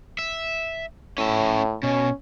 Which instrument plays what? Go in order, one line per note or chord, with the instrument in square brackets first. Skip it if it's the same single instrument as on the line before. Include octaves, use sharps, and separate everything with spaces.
[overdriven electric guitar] E5
[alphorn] A2 [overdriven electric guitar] C#4 E5
[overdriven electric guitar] B2 [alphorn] C#4